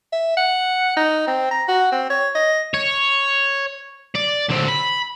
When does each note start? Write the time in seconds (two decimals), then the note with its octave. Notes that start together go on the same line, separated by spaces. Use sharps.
0.12 E5
0.37 F#5
0.97 D#4
1.27 C4
1.51 A#5
1.68 F#4
1.92 C4
2.10 C#5
2.35 D#5
2.74 C#5
4.15 D5
4.50 D3 C4
4.69 B5